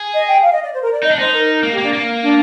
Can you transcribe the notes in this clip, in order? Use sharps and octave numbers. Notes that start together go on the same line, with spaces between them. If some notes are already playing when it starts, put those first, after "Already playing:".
Already playing: G#4
D#5
G5
F5
D#5
D5
C5
A#4
D5
D#4 D#5
D4
D#4 C5
A#4
A#3
G4
A#3 D4
A#3
D4